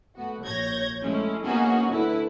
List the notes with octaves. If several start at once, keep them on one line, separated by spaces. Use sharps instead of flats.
A3 B3 F#4
A#1 C#5 G6 G#6 A#6
G#3 A3 C#4 E4
A#3 B3 C#4 D#4 F#4 G#4
D3 A3 E4 B4